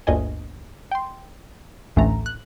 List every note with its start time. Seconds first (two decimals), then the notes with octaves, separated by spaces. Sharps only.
0.07 G1 D2 A#2 D#5 G#5
0.92 G5 C6
1.96 A1 D2 E3 A3 A#5
2.26 F#6